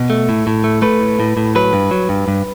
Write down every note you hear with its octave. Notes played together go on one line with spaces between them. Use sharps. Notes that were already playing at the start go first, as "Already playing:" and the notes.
Already playing: B2
A3
A2
A2
A3
A3 B4
A2
A2
A2
F#3 B4
G2
F#3
G2
G2